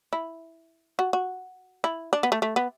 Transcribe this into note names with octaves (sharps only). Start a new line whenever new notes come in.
E4
F#4
F#4
E4
D4
B3
A3
A3
B3